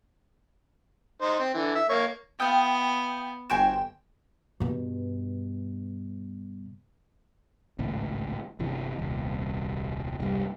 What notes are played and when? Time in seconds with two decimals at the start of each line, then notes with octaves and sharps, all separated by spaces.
1.22 D#4 C5
1.39 C4
1.54 D3 E3
1.75 E5
1.89 A#3 C#5
2.40 B3 F4 E5 G5 D#6 G6
3.50 G1 F#4 C5 G5 G#5 E7
4.60 G2 B2
7.79 G#1 C#2 A2
8.59 G1 C3 E3
8.99 D#1 C2
10.19 E1 C2 G2 G3